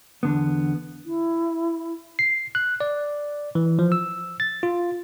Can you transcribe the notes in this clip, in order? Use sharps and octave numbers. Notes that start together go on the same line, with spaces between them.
E2 D3 B3
E4
C7
F#6
D5
E3
F3
E6
A6
F4